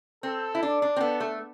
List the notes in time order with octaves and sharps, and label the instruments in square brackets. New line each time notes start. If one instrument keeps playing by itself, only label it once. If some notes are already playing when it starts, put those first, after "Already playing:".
[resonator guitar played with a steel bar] C4 [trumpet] A4
[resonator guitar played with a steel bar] E4
D4
D4
C4
[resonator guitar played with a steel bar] B3 [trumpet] A4
[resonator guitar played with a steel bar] A3